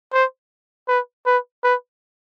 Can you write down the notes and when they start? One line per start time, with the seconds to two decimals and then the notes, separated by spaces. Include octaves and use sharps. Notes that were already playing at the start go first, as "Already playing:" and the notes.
0.13 C5
0.88 B4
1.26 B4
1.63 B4